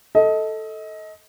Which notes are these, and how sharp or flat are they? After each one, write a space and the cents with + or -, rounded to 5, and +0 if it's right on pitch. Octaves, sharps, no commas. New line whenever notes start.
A4 +0 D#5 +25